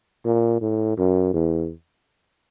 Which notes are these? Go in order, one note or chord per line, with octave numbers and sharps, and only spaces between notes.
A#2
A2
F#2
E2